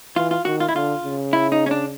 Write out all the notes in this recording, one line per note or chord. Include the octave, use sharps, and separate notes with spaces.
E3 F4
F4
D#3 F#4
F4
E4
D3 F4
C#3
E4
D#4
C#4
D4